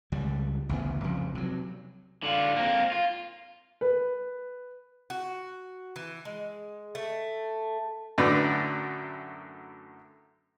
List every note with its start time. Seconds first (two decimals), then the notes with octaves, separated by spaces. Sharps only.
0.12 C#2 G3
0.69 A1 D2 C#3 B3
1.04 C2 F2 C#3
1.35 C3 F#3
2.23 D3 F4
2.56 A#3 C4
2.92 F4
3.81 B4
5.10 F#4
5.96 E3
6.25 G#3
6.95 A3
8.18 F#2 A2 D3 B4 D5